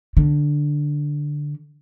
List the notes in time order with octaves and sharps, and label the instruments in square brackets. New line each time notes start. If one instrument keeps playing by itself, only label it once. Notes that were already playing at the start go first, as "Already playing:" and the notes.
[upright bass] D3